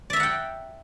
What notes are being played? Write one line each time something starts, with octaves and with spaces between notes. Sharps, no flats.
D5 E5 F#5 G5 A#5